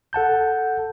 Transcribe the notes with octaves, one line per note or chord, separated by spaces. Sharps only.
A4 F#5 A5 G6